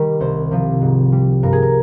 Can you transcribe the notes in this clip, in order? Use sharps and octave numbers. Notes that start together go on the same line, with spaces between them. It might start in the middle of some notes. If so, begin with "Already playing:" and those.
Already playing: D#3 G3 A#4
C2 C5
C3 F3
G#2
G3
G2 A#4
G#4
A#4